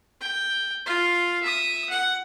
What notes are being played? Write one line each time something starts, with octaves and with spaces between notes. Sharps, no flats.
G5
F4 F5
E5 D#6
F#5